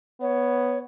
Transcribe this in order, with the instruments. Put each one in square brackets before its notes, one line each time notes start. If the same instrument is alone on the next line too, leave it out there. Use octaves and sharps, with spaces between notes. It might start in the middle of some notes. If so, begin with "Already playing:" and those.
[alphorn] B3 [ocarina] C#5